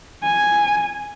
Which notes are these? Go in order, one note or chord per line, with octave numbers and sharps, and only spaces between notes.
G#5